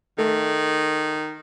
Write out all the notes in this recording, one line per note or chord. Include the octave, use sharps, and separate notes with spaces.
D#3 A3